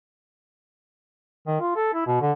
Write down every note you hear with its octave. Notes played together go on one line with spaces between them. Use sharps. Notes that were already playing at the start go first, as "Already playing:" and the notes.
D#3
F4
A4
E4
B2
D3